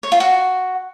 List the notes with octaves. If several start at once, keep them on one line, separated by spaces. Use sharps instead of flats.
C#5
F4
F#4